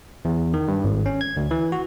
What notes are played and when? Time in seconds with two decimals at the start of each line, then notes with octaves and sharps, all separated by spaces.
0.25 E2
0.54 D#3
0.68 G2
0.84 G#1
1.06 C#4
1.21 G#6
1.37 D2
1.51 E3
1.72 F#4